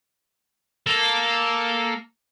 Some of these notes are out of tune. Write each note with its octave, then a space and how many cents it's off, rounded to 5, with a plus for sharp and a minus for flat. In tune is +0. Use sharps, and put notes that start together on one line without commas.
A#3 +0 A4 +0